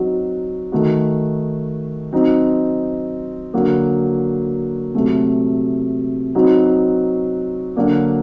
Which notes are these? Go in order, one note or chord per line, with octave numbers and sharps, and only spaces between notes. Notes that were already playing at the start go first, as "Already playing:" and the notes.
Already playing: F#3 C4 D#4 F#4
D#3 A3 D#4 F#4
F#3 C4 D#4 F#4
D3 F#3 A#3 F#4
C3 F#3 A3
F#3 C4 D#4 F#4
D3 F#3 A#3 D4 F#4